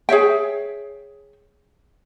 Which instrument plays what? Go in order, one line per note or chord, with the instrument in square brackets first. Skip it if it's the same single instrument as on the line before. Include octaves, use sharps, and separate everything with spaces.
[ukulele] G#4 C#5 E5 G5